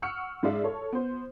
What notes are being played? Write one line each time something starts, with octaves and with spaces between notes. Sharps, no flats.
F#5 C#6 E6 F6 C#7
G#2 G#3 D5 E5
A4 C#5
B3 C5